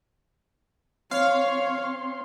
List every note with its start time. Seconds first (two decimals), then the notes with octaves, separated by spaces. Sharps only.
1.11 C4 C#5 F5 C6